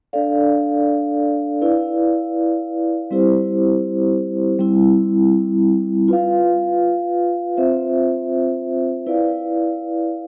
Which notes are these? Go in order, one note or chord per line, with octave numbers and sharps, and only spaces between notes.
D4 A4 D5 F5
E4 B4 D5 F5
G3 C4 E4 G4 C5
G3 C4 E4
F4 B4 F5
C4 F4 C5 E5
E4 B4 D5 F5